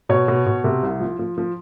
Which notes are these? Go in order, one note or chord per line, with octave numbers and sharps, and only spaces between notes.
B2 C#5
B2
B2
C3
C2
F3
F3
F3